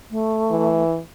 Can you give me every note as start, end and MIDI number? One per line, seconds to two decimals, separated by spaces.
0.11 0.83 57
0.51 0.99 52